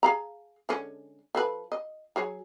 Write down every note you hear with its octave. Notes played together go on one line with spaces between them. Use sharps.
G#4 F5 A#5
D3 G#3 C#4
F3 A4 B4
D#5
F#3 G#4 C#5